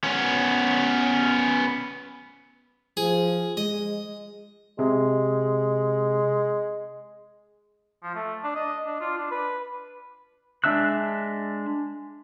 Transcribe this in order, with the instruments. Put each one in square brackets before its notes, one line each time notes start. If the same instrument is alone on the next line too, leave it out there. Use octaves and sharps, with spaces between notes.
[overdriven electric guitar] B3 C#4
[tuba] F3 [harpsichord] G#4
[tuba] G#3 [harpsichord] D#5
[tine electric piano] C3 [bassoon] G#3
[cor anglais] F3
A3
D4
D#5
D4
F4
D4
B4
[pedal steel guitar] G#3 D4 E5 E6 F#6